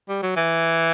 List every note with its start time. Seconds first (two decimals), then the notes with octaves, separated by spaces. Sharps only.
0.09 G3
0.23 F#3
0.36 E3